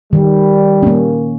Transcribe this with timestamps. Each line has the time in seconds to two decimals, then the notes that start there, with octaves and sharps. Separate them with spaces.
0.13 D#3 G3
0.83 A#3 C#4